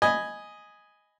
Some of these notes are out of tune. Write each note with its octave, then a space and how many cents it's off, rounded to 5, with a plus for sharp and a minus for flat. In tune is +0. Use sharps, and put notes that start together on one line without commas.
D#5 +0 G#5 +0 B5 +0